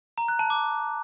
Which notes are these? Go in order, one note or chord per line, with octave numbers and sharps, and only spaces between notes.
A#5
F#6
A5
D6